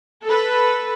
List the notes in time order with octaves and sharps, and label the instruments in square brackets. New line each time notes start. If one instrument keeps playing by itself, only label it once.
[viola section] A4 B4